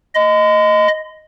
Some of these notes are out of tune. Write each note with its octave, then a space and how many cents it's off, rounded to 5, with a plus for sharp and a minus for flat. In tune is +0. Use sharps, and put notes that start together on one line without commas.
D#5 +5 C6 -45